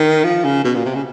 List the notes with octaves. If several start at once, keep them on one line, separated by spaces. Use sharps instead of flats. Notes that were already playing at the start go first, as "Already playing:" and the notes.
Already playing: D#3
F3
C#3
B2
A#2
C3
C#3